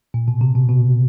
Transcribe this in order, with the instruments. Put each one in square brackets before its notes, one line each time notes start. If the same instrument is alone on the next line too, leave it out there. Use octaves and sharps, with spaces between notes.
[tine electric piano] A#2
B2
C3
B2
B2